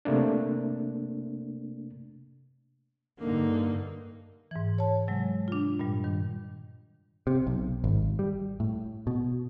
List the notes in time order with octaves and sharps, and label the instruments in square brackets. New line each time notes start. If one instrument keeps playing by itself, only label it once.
[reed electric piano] C3 A3 A#3 D4
[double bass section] G2 D3 [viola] A#3 D#4
[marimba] G#2 E3
C#5 A5
C3 F#3 G#3
D4 F4
G2 A#2 G3
D#3
[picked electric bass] C3
B1
G#1
G3
A2
B2